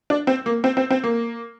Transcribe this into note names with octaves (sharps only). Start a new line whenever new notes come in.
D4
C4
A#3
C4
C4
C4
A#3